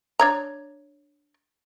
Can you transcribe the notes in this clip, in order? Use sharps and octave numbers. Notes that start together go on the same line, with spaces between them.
D4 C#5 A#5